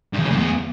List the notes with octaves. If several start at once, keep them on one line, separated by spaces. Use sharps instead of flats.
G2
E2
C#3
A2
E2